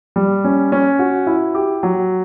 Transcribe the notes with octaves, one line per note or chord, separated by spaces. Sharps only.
G3
C#4
C#4
F#4
E4
G4
F#3